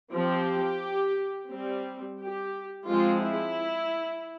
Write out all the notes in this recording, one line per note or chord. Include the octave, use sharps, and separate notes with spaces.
F3 C4 G4
G3 C4
G4
F3 G#3 C4 F4
E4